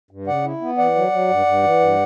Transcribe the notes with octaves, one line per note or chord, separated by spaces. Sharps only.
G2
C#3 D5 F#5
E4
B3
E3 D5 F#5
F#3
F#3
G2
G2
E3
G2